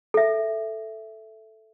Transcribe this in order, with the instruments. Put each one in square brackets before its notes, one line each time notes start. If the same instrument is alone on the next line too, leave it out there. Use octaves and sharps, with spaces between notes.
[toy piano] A4 E5